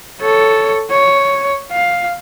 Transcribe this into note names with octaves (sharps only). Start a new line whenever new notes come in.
A4 C#5
C#5
F5